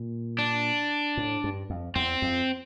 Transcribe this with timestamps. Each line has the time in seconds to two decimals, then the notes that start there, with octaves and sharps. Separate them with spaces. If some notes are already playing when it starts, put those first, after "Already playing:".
Already playing: A#2
0.39 D4
1.17 A2
1.44 G2
1.70 F2
1.96 E2 C4
2.22 F2